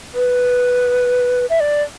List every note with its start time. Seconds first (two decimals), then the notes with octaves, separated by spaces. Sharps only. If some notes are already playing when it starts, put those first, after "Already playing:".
0.14 B4
1.50 E5
1.60 D5